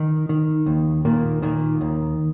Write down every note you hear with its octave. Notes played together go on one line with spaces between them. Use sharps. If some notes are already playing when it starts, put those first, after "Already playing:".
Already playing: D#3 D#4
D#3
D#2
A#2 D#3 A#3
A#2 D#3 A#3
D#2